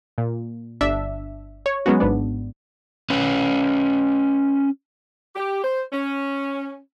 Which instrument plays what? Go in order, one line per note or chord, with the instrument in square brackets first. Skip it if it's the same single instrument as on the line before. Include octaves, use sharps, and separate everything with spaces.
[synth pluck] A#2
G1 D4 E5
C#5
F#3 G#3 B3 C#4 F#4
G#1 G#2 B3 D4
[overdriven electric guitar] C#4 B4
[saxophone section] G4
C5
C#4